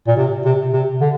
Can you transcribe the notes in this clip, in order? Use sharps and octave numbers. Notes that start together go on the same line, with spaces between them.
A#2
C3
C3
C3
D3